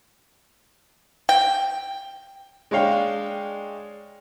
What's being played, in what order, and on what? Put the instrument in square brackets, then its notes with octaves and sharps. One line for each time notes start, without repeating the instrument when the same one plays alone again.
[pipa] G5
[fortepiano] G#3 D4 C#5 F5 G5